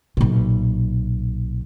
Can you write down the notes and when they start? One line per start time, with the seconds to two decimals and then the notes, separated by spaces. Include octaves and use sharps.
0.17 B1 A#2